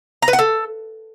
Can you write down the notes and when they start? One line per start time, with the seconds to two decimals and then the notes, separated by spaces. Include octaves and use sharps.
0.22 A#5
0.28 B4
0.33 F#5
0.39 A4